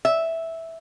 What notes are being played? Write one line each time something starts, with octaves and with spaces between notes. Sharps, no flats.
E5